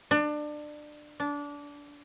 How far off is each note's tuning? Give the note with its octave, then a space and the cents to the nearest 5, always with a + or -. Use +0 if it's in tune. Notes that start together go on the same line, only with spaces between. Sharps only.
D4 +25
D4 -20